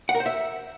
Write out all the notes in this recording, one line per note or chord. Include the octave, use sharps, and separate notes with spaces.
F#5
A#4
C5
E5